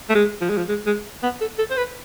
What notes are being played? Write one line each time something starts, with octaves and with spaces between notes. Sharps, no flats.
A3
G#3
F3
G#3
F3
G#3
G#3
B3
A4
A4
C5
B4